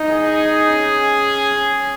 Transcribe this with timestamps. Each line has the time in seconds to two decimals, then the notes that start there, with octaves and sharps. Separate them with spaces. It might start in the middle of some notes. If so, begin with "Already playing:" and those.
Already playing: D#4
0.08 G#4
0.67 C#4